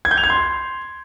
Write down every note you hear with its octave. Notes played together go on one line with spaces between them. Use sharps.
G#6
G6
F7
G#6
C6